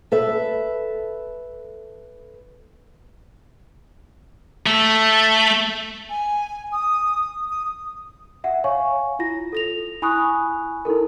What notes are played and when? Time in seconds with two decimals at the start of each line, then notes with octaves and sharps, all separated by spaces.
0.12 A4 B4 E5
4.66 A3
6.10 G#5
6.72 D#6
7.50 D#6
8.44 E5 F#5
8.64 C#5 F5 G#5 C#6
9.19 E4 F4 A#6
9.53 A4 A#6 F7
10.02 E4 G#5 B5 C#6 D#6 F#6
10.85 D#4 E4 A4 A#4